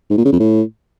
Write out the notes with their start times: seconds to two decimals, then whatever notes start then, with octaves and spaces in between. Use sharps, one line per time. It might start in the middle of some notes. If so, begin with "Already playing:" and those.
0.10 G#2
0.18 A#2
0.25 C#3
0.32 F2
0.40 A2